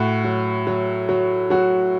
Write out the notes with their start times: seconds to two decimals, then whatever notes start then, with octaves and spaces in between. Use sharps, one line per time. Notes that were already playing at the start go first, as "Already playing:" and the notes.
Already playing: A2 F#4
0.24 F#3
0.67 F#3
1.09 F#3
1.50 F#3 F#4